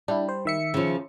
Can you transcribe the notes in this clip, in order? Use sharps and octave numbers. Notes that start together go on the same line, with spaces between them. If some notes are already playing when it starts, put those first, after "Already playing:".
G3 D4 E4
C5
D#3 E5 C#7
C#3 F3